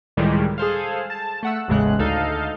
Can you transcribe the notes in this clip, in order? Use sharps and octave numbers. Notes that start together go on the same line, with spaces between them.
C#2 A2 D#3 E3 G3 G#3
G#4 A4 C5 F5
A5
A3 F#5 E6
A1 E2 A2 C#3 G#3 F#6
D2 D#4 A4 F5 G6